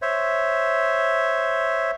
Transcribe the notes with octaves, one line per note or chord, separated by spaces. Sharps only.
C5 C#5 E5